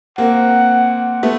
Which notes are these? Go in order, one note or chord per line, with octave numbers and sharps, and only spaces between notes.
A#3 C4 F#5
A3 B3